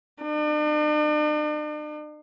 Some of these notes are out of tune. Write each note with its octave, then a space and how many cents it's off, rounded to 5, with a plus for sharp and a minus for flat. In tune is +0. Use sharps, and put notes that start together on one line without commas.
D4 +45